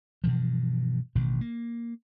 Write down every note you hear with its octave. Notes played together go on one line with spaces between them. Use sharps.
G2 B2 E3 F3
A1 B2 D#3
A#3